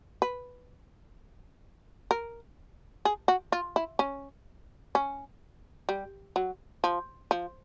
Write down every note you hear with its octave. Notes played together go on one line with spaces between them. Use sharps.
B4
A#4
G#4
F#4
F4
E4
C#4
C#4
G3
F#3
F3
F3